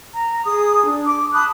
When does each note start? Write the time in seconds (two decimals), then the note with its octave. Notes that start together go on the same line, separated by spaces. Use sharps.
0.14 A#5
0.46 G#4 D#6
0.83 D4
1.06 D6
1.33 A5 B5 D#6 F#6